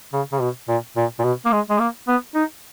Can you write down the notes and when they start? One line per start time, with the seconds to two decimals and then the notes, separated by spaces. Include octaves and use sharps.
0.13 C#3
0.32 C#3
0.40 B2
0.68 A#2
0.96 A#2
1.19 A#2
1.23 B2
1.45 A#3
1.52 G#3
1.70 G#3
1.79 A#3
2.08 B3
2.35 D#4